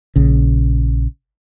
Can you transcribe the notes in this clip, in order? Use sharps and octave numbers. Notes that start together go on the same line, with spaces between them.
A#1 C#3